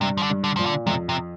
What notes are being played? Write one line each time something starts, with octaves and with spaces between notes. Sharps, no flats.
G2 C3
F3
D3
G2
D3
A#2 F3
D3
F2 C3
C3